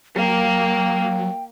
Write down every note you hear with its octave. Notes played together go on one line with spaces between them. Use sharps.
F#3 A#3 G5